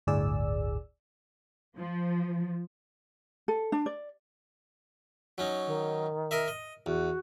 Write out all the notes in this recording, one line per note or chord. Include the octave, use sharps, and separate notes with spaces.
G1 D2 A2 G#4 D5 E6
F3
A4
D4
D5
F#3 C#4 D#4
D#3
A#4 D#5 E5
D#5
E2 F#4